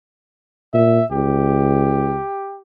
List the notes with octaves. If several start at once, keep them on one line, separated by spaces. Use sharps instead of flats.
A#2 E5
C#2 G4